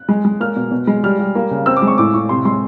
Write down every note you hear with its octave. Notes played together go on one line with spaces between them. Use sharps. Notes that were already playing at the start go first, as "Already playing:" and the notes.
Already playing: F#6
G#3
G#3
A#3 F6
B2
B2
G#3
G3 F6
G3
A#3
C#3
C4 E6
D6
G#3
C#6
A2 D6
A2 C#6
C3 C6
G#3 C6